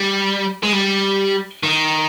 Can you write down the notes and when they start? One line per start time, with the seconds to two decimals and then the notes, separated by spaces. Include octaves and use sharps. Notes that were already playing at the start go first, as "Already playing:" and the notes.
Already playing: G3
0.63 G#3
0.73 G3
1.63 D#3